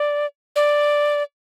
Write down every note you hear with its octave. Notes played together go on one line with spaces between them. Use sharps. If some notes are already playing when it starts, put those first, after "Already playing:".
Already playing: D5
D5